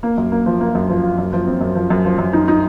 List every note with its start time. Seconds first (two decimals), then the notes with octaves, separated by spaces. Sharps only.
0.03 A#3
0.18 F#2
0.32 A#3
0.46 F3
0.61 A#3
0.75 F#2
0.90 F3
1.03 F4
1.18 F#2
1.33 F3
1.47 C4
1.61 F#2
1.76 F3
1.90 F#2
2.05 F3
2.18 F#2
2.33 D#4
2.48 D#4